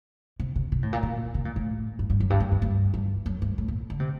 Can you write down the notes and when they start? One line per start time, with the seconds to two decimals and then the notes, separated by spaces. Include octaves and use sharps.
0.40 C3
0.56 C3
0.72 C3
0.83 A2
0.93 A#2
1.03 A#2
1.34 C3
1.45 A#2
1.56 A2
1.99 G2
2.10 G2
2.20 F#2
2.30 G2
2.40 G2
2.52 G2
2.62 G2
2.94 G2
3.26 F#2
3.42 G2
3.58 A2
3.68 A#2
3.90 D3
4.00 C3